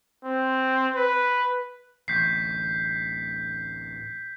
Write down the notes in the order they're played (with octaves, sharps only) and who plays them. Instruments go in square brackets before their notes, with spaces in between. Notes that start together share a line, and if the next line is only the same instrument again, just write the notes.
[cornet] C4
B4
[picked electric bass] D1 A1 [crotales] G6 B6 C7